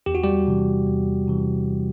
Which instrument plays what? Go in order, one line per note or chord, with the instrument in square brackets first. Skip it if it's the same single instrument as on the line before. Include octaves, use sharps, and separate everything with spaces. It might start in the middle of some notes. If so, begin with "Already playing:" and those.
[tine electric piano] E2 G4
F#4
G3 G4
C3 E3
E2
C3 E3